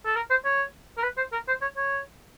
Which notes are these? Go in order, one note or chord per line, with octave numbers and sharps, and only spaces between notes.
A4
A#4
C5
C#5
A#4
B4
C5
A#4
C5
C#5
C#5